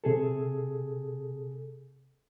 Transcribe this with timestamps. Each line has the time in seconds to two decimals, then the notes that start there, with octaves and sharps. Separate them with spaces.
0.04 C3 G#4 A4